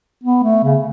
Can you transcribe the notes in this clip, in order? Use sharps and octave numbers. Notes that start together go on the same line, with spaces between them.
B3
A3
C#3